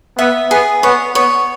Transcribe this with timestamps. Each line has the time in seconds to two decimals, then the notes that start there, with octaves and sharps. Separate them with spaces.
0.18 B3 E5
0.50 B3 G#4
0.83 B3 C#5
1.15 B3 C#5